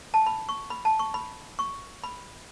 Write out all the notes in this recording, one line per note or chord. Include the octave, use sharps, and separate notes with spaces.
A5
B5
C#6
B5
A5
C#6
B5
C#6
B5